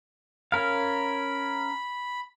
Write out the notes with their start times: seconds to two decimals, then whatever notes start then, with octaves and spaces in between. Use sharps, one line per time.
0.52 C#4 A#4 F5 B5